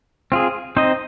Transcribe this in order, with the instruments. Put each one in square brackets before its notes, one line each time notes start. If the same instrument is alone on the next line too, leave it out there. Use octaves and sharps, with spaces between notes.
[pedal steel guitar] C4 F4 G#4
C4 D#4 C5 D#5